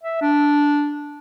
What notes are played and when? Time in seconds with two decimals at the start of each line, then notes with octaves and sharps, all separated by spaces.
0.03 E5
0.21 D4